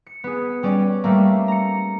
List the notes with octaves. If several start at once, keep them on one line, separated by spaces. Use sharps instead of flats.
C#7
B3 G#4
G3 C#4 D5
G3 A3 A#3
A#5 C#7